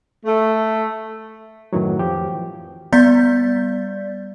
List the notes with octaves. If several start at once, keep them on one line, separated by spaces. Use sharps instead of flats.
A3
F#2 A2 D#3 E3 F#3
F2 F3 G4
E3
G3 B3 D5 G6 A6 B6